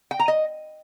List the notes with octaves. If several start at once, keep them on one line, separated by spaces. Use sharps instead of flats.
G5
A#5
D#5